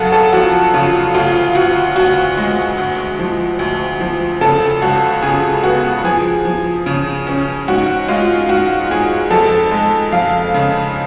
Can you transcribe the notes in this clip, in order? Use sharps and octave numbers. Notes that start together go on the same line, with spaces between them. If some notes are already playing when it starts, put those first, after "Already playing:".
Already playing: F#2 C#3 A4 F5 F#5
A4
F3 F#4
C#3 F4
D2 F4
D2 F#4
D2 F#4
G#3
D2
F3
D2
F3
C#3 A4
C#2 F#4
C#3 G#4
B3 F#4
F3 G#4
F3
C#3
C#4
G#2 F#4
G#3 F4
G#2 F#4
G#2 G#4
F2 A4
G#3
F2 F5
C#3